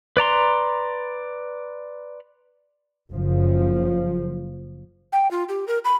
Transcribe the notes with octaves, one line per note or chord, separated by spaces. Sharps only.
B4 D5 A#5 C6
F#1 F3
G5
F4
G4
A#4
B5